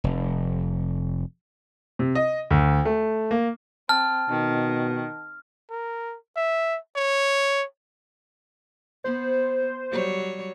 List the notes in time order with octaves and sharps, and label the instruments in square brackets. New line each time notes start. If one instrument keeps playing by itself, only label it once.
[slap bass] F1
[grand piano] C3
D#5
D2
A3
A#3
[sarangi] C4 [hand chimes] A5 [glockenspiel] F6
[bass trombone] B2 [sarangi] D#3
[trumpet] A#4
E5
C#5
[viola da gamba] B3 [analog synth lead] C5
[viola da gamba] F#3 G3 C#5